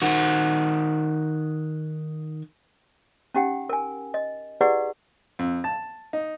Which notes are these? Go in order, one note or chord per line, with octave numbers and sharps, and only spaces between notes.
D#3 F#4
C#4 D#4 G4 F#5 G5
A#4 G#5
D#5
E4 G4 G#4 B4 D5 F#5
F2
A5
D#4